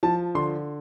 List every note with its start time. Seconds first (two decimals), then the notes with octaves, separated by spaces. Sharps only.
0.03 F3 A5
0.35 D3 C6